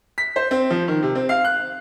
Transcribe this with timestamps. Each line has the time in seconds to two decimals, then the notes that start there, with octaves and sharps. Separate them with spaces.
0.18 B6
0.36 C5
0.51 C4
0.71 F3
0.88 D#3
1.02 C3
1.15 C4
1.29 F5
1.45 F#6